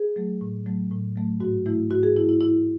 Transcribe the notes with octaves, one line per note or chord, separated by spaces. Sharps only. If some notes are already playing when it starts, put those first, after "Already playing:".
Already playing: G#4
F#3 A3
A2
F#3 A3
A2
F#3 A3
G#2 F#4
E3 A3 E4
G#2 F#4
G#4
E3 A3 E4
E4
G#2 E4